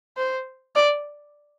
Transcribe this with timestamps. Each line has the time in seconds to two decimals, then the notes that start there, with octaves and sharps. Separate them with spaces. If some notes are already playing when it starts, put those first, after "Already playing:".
0.17 C5
0.76 D5